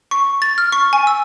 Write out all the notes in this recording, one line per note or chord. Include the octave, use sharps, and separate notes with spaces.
C#6
A6
F6
C#6
G#5
E6